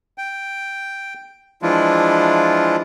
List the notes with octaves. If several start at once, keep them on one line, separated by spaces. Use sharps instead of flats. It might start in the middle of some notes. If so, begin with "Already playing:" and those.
G5
E3 F3 G#3 D4 E4 F4